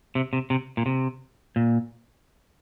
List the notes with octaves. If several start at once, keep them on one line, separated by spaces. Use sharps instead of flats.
C3
C3
C3
A#2
C3
A#2